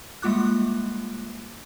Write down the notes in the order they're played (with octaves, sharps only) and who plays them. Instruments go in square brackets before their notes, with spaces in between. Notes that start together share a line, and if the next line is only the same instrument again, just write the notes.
[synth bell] G3 G#3 A#3 F4 D6 F#6